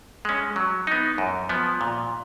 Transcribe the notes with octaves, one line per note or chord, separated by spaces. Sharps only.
G#3 C#4
F#3
B3 D#4
F#2
F3 B3
A#2